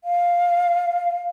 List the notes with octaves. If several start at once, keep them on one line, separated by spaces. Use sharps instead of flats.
F5